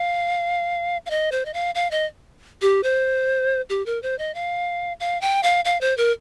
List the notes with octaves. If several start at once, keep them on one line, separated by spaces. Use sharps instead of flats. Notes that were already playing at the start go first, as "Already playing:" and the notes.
Already playing: F5
F5
D#5
C5
D#5
F5
F5
D#5
G4
C5
G4
A#4
C5
D#5
F5
F5
G5
F5
F5
C5
A#4